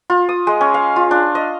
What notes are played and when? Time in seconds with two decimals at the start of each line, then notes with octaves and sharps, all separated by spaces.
0.10 F4
0.29 D#6
0.47 G#3
0.61 C#4
0.74 F5
0.96 F4
1.11 D4
1.35 D#5